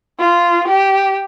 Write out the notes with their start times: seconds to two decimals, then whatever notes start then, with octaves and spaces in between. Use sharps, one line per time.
0.19 F4
0.68 G4